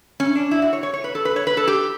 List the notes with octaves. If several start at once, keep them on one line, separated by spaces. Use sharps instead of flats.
C#4
D4
E4
F#4
C#5
C#5
C#5
B4
A4
B4
C#5
B4
A4
G4